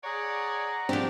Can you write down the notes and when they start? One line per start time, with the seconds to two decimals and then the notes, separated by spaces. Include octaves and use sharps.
0.04 G#4 C#5 D5 F#5 A#5
0.89 F3 C4 D4 G4